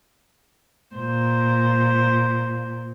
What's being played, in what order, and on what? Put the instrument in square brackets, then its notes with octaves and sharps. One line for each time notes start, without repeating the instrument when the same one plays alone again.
[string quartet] A#2 [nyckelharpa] C5